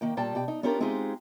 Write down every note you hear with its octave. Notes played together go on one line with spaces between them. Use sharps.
D#3 A#3 G5
A#2 G3 G5 A5
B2 G4 G5
D#4
B3 C#4 D4 F4 G4 A#4
G#3 C4 D#4 F4 G4 G#4